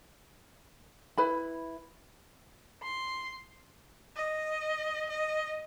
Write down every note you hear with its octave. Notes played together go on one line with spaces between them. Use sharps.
E4 B4 B5
C6
D#5
D#5